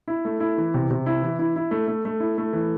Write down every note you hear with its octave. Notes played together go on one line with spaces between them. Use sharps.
E4
A3
E4
E3
C3
C3
E4
E3
E4
E4
A3
A3
A3
E4
A3
E3